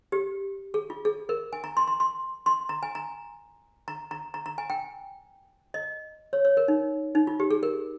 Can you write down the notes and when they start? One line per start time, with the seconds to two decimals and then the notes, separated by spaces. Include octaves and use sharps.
0.12 G4
0.74 G#4
0.90 F4
1.05 G#4
1.29 A#4
1.53 G#5
1.64 A#5
1.77 C6
1.87 C6
2.00 C6
2.46 C6
2.69 A#5
2.83 G#5
2.95 A#5
3.88 A#5
4.11 A#5
4.34 A#5
4.46 A#5
4.58 G#5
4.70 G5
5.74 D#5
6.33 C#5
6.45 C#5
6.57 A#4
6.68 D#4
7.15 D#4
7.27 F4
7.40 G4
7.50 G#4
7.63 A#4